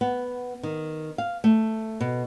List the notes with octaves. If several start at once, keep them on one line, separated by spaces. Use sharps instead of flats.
B3
D#3
F5
A3
B2